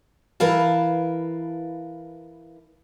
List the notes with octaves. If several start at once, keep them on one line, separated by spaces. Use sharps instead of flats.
E3 A#4 B4 F5 A5